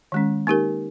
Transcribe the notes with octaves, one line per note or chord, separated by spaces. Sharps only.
D#3 G#3 C#4
A#3 D#4 G4 A#4